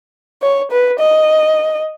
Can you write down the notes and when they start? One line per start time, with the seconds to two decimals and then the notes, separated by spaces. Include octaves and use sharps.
0.42 C#5
0.71 B4
0.99 D#5